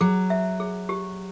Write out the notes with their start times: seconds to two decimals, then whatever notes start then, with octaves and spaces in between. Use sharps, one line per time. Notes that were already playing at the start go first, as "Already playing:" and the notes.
0.01 F#3 G#4
0.30 E5
0.60 G#4
0.89 G4